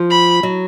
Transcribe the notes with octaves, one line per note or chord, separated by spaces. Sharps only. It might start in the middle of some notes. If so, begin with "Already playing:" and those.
Already playing: F3
B5
F#3